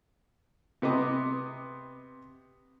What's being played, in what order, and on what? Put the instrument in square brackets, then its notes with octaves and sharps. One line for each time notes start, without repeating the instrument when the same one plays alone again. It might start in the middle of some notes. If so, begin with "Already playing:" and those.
[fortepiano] C3 B3 D#5 D6